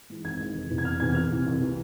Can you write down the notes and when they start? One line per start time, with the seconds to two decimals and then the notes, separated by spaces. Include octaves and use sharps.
0.10 G#2 E3
0.24 G#1 G#6
0.40 G#2 E3
0.55 F1
0.70 E2 C3 E3
0.78 G#6
0.85 F1 F6
1.00 E2 C3 E3 G#6
1.15 C2 F6
1.31 C3 E3
1.46 C2
1.61 C3 E3